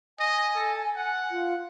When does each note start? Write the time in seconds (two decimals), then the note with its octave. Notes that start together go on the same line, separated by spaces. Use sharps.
0.19 D#5 G#5
0.56 A4
0.96 F#5
1.31 F4